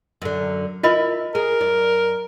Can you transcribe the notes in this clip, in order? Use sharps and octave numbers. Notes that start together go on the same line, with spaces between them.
F#2 D3
E4 F4 A#4 B4 D#5 B5
G#4 A#4
F#2 D5